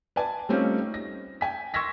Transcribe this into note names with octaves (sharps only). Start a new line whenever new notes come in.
B4 D5 G#5 A5
G3 A3 C4 C#4 D#4 F4
A#6
G5 G#5 B6
C6 C#6 E6 G#6 A#6 B6